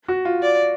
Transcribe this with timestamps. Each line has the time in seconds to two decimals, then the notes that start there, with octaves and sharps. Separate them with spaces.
0.08 F#4
0.25 F4
0.43 D5